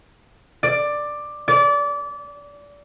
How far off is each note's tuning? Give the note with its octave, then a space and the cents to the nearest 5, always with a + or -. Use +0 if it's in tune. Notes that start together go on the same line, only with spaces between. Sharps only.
D5 +10
D5 -25